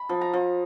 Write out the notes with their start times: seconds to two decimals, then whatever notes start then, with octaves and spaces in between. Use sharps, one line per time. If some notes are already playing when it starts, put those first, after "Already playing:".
Already playing: B5
0.09 F3
0.21 A#5
0.33 F3